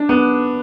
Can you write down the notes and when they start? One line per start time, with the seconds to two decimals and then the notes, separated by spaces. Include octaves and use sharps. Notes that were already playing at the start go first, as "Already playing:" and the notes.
Already playing: D4
0.09 B3